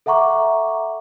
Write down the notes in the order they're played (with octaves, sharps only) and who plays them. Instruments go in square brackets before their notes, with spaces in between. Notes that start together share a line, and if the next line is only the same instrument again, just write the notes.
[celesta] A4 E5 F#5 A#5 C#6 D6